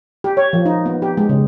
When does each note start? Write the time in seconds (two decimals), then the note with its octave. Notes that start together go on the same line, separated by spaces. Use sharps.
0.24 G4
0.37 C#5
0.53 F3
0.66 D#4
0.86 B3
1.02 G4
1.17 G#3
1.29 C#3